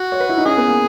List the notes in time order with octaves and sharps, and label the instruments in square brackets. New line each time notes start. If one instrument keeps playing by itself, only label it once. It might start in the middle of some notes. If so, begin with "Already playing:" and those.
Already playing: [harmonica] F#4
[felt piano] C#5
B4
E4
D#4
[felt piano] C#4 [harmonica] G#4
[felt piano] B3
A#3